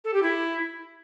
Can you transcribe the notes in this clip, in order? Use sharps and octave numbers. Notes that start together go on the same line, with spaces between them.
A4
G4
E4